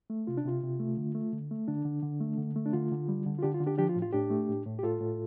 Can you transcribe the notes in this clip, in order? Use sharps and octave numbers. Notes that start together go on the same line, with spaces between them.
A3
C3 F4
D4
C3 F4
C3
A3
D3
A3
D3
A3
D3 D4
D3
D3
A3
D3
A3
D4
D3 F4
D3
G3
D3
F4
D3 D4 G4
F4
D3
D4 G4
F3 D4 G4
F4
A2
F4
A2 D4 G4
A3
A2
A2
G4
A2 F4 A4
A2